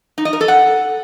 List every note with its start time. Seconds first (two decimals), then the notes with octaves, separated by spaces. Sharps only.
0.18 D#4
0.25 D#5
0.33 A#4
0.41 A4
0.48 F#5